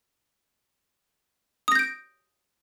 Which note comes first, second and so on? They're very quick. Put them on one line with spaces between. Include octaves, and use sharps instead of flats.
D#6 A#6 G6 D7